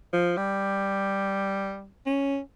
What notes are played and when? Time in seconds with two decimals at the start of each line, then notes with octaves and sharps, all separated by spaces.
0.13 F3
0.37 G3
2.06 C#4